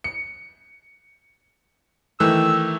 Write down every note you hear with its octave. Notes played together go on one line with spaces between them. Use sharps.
C#7
D#3 E3 A3 E6